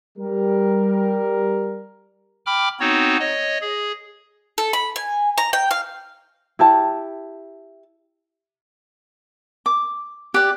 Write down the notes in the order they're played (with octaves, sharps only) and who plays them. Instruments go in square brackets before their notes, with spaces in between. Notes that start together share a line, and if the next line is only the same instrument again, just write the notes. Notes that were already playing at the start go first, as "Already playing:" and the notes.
[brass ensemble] G3 A#4
[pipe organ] G5 B5 D6 F6
B3 C4 D#4 F#4 C#5
C#5 D#5
G#4
[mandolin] A4
B5
G#5
A#5
G5
F5
[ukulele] E4 G4 A5
[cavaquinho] D6
[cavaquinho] G4 D5 [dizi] F#6